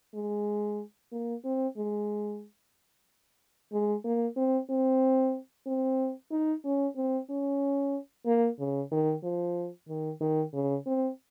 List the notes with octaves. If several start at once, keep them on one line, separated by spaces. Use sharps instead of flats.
G#3
A#3
C4
G#3
G#3
A#3
C4
C4
C4
D#4
C#4
C4
C#4
A#3
C#3
D#3
F3
D#3
D#3
C#3
C4